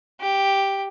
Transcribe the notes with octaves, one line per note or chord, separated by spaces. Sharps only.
G4